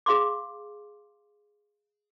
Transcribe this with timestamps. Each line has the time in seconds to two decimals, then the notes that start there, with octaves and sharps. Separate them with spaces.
0.06 G#4 F5 C6 D6